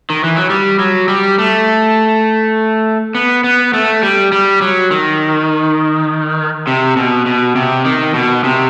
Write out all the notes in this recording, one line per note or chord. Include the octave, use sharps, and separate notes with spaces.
D#3
E3
F#3
G3
F#3
G3
A3
B3
B3
A3
G3
G3
F#3
D#3
C3
B2
B2
C3
D#3
B2
C3